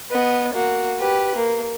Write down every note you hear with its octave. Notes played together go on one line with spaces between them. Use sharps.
B3 D#5
A#3 F#4
G4 B4
A#3